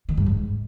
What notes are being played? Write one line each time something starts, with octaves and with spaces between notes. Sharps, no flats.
D#3
G2
G#2